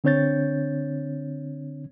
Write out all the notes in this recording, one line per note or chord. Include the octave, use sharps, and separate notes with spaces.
D3 C4 D4 C#5 G6 A6